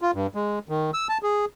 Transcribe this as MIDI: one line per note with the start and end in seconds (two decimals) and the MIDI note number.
0.02 0.11 65
0.14 0.27 43
0.35 0.59 56
0.69 0.91 51
0.94 1.08 88
1.09 1.18 81
1.23 1.45 68